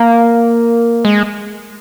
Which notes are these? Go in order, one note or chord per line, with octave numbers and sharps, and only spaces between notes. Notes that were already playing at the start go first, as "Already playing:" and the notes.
Already playing: A#3
G#3